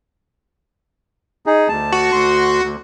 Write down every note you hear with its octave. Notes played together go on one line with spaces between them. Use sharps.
D#4 G#4
D2 A5
F#4
D2 C6
D2